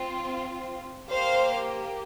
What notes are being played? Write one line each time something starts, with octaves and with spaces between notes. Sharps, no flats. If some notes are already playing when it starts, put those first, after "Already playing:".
Already playing: C4 F4
A#3 G4 C5 F5